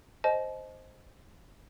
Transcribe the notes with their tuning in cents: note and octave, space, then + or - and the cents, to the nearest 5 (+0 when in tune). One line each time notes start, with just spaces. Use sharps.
C5 +0 D#5 +0 A5 -40